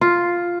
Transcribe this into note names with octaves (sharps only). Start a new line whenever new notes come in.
F4